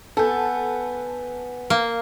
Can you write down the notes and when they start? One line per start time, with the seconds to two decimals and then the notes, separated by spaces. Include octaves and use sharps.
0.17 B3 A4 B4 F#5 G#5 G6
1.70 A#3